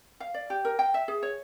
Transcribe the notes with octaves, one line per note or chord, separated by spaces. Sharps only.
F5
D5
G4
A#4
G5
E5
G#4
C#5